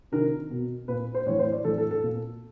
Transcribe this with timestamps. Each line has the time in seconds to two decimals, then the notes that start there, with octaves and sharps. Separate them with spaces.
0.12 C3 D#3 A#4
0.50 B2
0.88 A#2 B4
1.15 C5
1.26 A2 E3 C#5
1.39 C5
1.52 D5
1.64 A2 E3 A4
1.78 A4
1.91 A4
2.03 A#2